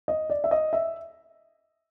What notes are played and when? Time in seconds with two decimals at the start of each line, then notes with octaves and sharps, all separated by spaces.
0.08 D#5
0.30 D5
0.44 E5
0.51 D#5
0.73 E5